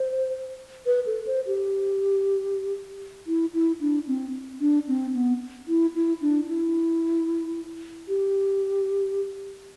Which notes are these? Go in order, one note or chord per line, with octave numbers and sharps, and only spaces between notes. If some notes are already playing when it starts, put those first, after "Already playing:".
Already playing: C5
B4
A4
C5
G4
E4
E4
D4
C4
D4
C4
B3
E4
E4
D4
E4
G4